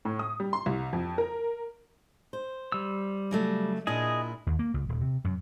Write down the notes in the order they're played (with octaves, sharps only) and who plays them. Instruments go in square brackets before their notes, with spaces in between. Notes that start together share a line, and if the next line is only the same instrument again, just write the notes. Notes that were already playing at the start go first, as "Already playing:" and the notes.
[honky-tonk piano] A2
D#6
G3
C6
C2
F2
A#4
[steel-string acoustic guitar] C5
[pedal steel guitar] G3 E6
[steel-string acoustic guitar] C#3 F#3 A3
[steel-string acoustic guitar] A#2 D4 E4 [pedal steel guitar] G#4 D#5
[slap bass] D#2
A#3
C#2
D#1
C3
F#2